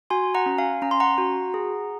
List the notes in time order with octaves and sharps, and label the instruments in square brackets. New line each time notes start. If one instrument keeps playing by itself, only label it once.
[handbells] F#4 G#5 C6
F#5 A#5
C#4
F5 G#5
C#4 A#5
C6
F#5 A#5
F#4
G#4